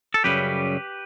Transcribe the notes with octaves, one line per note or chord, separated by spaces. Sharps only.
A4
F#2 C#3 G3 G4 B4